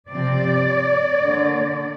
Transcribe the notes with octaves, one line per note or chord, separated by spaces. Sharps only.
C3 F3 C4 D5
D3 A#3